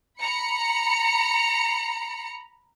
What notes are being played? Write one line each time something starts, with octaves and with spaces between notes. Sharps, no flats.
A#5 B5 C#7